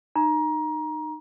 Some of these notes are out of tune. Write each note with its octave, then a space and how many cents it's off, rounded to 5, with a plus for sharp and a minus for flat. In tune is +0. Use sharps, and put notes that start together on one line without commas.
D#4 -25 A#5 +25